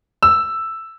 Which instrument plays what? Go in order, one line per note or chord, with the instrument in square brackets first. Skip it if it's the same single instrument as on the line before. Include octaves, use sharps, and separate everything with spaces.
[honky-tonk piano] E6